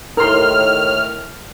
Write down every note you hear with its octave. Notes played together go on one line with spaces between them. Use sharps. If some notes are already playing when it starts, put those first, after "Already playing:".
D#2 A2 A#4 C6 F6